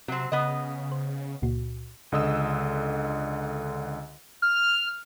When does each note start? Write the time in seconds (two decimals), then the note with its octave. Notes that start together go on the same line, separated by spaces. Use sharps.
0.08 C3 F#3 C4
0.32 C#3 B3 D#5
0.92 C5
1.42 C#2 A#2 F#4
2.12 C#2 D3 D#5 D#6 E6
4.42 F6